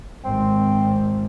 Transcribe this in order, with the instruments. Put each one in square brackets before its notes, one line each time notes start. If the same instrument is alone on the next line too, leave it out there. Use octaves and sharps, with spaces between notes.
[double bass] G#1 [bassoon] C4